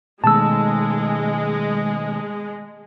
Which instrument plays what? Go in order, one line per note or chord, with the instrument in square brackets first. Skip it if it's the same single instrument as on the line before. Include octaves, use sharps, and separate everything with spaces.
[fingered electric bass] B2 D#3 A3 [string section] G#3 [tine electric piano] A5 E6